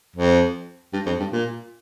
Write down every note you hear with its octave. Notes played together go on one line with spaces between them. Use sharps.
F2
G2
F2
G2
A#2